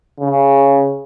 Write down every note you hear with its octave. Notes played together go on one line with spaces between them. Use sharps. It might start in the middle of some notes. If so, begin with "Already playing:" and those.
C#3